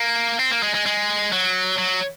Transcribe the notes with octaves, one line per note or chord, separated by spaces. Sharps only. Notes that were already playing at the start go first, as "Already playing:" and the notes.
Already playing: A#3
C4
A#3
G#3
G#3
G#3
F#3
F#3